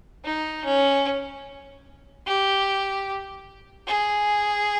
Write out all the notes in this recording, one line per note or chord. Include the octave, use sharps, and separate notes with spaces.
D#4
C#4
G4
G#4